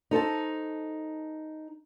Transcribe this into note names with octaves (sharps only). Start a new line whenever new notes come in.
D#4 A4 C5 A5